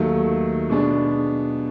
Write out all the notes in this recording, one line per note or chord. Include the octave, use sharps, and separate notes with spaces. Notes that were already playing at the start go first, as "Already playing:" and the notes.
Already playing: D#2 D#3 F#3 A3
B2 G#3 B3 D4